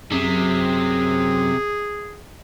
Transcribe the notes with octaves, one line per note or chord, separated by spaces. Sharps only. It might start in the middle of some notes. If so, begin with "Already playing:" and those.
F#2 C3 G#4